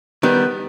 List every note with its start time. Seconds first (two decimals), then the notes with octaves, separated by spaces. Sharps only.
0.23 D#3 G3 B3